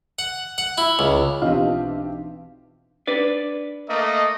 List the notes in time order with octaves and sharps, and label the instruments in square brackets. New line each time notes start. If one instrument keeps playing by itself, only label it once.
[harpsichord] F#5
F#5
E4
C#2
[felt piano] B1 C4 G4 [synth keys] E3 D4 [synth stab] F4 D#5 [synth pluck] F5
[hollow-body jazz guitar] D4 B4 D5
[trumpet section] A3 A#3 D#5